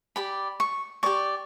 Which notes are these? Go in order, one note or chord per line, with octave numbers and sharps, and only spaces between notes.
G4 D5 B5
C#6
G4 D5 C#6